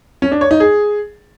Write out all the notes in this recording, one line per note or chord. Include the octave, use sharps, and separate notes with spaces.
C#4
D4
C#5
D#4
G#4